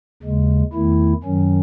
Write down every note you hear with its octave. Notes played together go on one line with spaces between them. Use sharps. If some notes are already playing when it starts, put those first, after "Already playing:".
D#2 C#3 G#3
E2 D#3 A3 E4
F#2 D#3 F#3 C#4